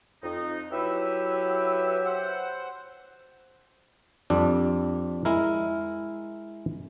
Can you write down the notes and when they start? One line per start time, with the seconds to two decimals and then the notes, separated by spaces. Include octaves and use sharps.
0.23 F2 D#4
0.72 F#3 E4 G4 B4 E5 E6
2.05 C5 F#5
4.30 F2 G3 D4
5.25 G#3 E4 A#4